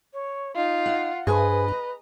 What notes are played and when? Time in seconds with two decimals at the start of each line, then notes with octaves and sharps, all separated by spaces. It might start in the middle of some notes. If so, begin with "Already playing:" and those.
0.13 C#5
0.56 D#4 F4
0.86 F#5
1.27 G2 G#4 B4 C5 D#5 G#5
1.68 A#5